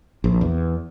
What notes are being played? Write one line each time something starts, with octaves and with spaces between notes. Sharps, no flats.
A#1
E2